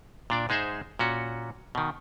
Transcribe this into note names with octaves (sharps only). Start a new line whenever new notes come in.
A#2 D4 D5
G#2 G#3 D#4 G#4 C5 E5
A#2 C#4 F#4
B2 D#3